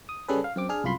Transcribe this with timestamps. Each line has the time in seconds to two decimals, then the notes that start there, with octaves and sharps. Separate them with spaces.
0.09 D#6
0.28 C#3 G3 C#4 G#4 A4 B4
0.44 F5
0.56 F#2 C4 D6
0.69 D4 G#4 F6
0.84 C2 F#2 F4 B5 C6